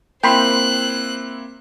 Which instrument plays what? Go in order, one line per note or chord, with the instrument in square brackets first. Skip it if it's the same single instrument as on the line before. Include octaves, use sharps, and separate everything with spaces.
[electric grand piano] A#3 C4 E4 [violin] C5 F#6 [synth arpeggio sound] G5 B5 C6